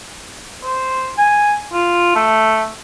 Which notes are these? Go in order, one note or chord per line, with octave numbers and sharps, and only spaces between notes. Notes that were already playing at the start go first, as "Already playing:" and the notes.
C5
G#5
F4
A3